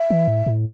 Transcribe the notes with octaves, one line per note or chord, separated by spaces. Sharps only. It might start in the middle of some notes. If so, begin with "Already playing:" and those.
Already playing: E5
E3
A2
A2